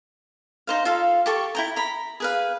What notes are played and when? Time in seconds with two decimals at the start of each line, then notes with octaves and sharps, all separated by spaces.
0.67 D#4 C5 F5
0.85 F4 A4 F5
1.26 G4 A4 C#6
1.55 E4 G5 A#5
1.76 A#5 B5
2.20 G#4 B4 F5